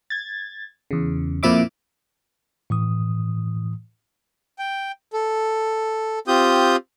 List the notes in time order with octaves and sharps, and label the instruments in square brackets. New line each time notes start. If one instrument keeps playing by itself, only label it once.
[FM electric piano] G#6 A6
E2 C#3
F2 A#2 F3 E4 E5 D6
[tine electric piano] A2 E3 D#6
[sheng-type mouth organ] G5
A4
C4 F4 G4 D#6 G6